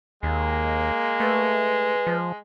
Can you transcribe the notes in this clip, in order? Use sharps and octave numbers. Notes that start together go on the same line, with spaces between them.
D#2 G#3 A#3
A3 B4
F3